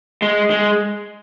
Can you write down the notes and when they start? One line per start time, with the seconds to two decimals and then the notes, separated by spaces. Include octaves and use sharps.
0.22 G#3
0.50 G#3